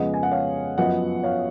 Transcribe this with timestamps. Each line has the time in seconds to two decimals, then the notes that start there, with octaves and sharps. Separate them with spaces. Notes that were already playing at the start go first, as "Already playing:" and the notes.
Already playing: F2 C#3 G#3 B3 D#5 F#5
0.14 G#5
0.23 F#5
0.31 C#5 F5
0.78 F#2 F3 B3 D#5 F#5
1.23 C#5 F5